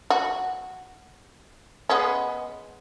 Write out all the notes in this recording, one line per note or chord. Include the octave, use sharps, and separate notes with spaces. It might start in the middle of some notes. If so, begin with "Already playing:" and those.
F#4
G#3 B3 C#4